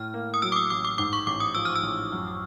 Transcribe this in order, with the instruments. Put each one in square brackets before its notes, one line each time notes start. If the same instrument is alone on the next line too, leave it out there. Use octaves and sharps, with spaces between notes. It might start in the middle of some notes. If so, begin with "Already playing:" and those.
Already playing: [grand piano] A2 [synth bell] F6
[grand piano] A#3
[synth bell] D#6
[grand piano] F#3 [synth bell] E6
[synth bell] D6
D#6
[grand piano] A1 [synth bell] D6
[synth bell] D6
[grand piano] G#2 [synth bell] D6
[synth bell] C#6
[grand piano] A1 [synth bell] D6
[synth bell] D#6
[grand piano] F3 [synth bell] E6
[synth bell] F6
E6
[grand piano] A1
F#2